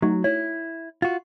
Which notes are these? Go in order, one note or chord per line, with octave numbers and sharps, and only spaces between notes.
F#3 A3 D#4 F#4
E4 C#5
F4 F#4